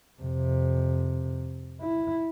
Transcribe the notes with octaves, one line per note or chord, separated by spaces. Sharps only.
F2 C3
E4